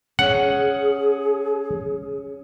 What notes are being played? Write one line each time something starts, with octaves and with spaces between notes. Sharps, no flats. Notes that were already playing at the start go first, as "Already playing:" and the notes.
C#4 G#4 F#5